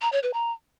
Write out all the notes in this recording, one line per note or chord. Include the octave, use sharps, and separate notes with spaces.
A#5
C#5
B4
A#5